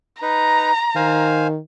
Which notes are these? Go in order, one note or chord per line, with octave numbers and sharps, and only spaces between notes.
D#4 B4 A#5
D#3 C5 F5 G#5